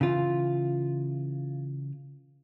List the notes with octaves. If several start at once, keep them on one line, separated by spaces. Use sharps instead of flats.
C#3 E3 F4